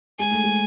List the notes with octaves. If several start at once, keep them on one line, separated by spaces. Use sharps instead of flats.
G#3 G#5
A3
G#3